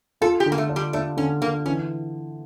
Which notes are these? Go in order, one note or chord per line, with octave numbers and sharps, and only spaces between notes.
F4 A4
G4
D3
A#3
A3
D4
G3
A3 D4
D3 C#4
D3 A#3
E3 C#4